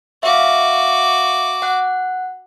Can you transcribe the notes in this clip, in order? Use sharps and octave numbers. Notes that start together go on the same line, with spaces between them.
F#4 E5 F5 D6
F#5 F#6